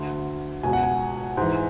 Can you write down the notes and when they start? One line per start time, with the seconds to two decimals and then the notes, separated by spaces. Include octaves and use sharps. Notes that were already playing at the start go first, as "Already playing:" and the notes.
Already playing: D2 D3 F#5
0.63 C#2 B2 G#5
0.73 F#5
0.83 G#5
1.37 G#2 E3